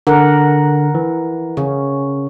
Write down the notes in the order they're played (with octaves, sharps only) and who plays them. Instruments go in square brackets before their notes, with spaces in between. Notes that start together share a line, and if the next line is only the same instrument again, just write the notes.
[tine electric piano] D3 [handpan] A#4 F#5
[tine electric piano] E3
[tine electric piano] C#3 [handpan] C#4